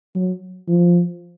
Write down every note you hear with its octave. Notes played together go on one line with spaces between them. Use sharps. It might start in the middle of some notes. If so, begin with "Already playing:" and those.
F#3
F3